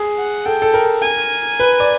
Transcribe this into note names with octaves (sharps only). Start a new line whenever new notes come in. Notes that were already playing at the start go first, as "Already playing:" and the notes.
Already playing: G#4
F#5
A4 G5
A4
A#4
G#5
B4
D5